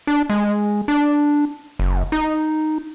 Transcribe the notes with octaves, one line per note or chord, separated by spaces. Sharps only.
D4
G#3
D4
F#1
D#4